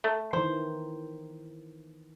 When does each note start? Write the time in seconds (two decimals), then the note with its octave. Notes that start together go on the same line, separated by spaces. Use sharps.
0.04 A3
0.33 D#3 E3 C5